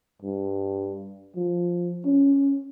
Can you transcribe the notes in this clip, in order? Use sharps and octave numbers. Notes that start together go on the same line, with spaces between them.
G2
F3
C#4